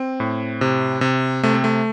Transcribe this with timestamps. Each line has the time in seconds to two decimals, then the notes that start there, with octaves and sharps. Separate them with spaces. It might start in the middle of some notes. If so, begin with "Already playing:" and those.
Already playing: C4
0.20 A2
0.61 C3
1.01 C3
1.43 C3 A3
1.54 C4
1.64 A3